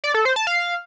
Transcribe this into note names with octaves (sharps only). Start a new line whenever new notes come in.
D5
A4
C5
A5
F5